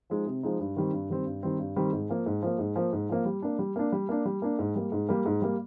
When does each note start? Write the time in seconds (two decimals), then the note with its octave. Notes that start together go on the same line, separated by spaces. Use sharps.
0.10 F3 G#3 D#4
0.26 C3
0.43 F3 G#3 D#4
0.59 G2
0.76 D#3 G3 C4
0.93 G2
1.10 D#3 G3 C4
1.26 G2
1.43 D#3 G3 C4
1.59 G2
1.76 D#3 G3 C4
1.93 G#2
2.09 F3 A#3
2.26 G#2
2.42 F3 A#3
2.59 G#2
2.76 F3 A#3
2.93 G#2
3.09 F3 A#3
3.25 G3
3.42 A#3 D4
3.59 G3
3.76 A#3 D4
3.92 G3
4.09 A#3 D4
4.25 G3
4.42 A#3 D4
4.59 G#2
4.75 G3 A#3
4.92 G#2
5.09 G3 A#3
5.26 G#2
5.42 G3 A#3